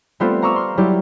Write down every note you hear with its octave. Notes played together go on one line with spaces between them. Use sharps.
G3 A3 B3 C4 F4 A4
F5 A#5 C#6 D6 E6
C6 F6
F#3 G3 E4 G4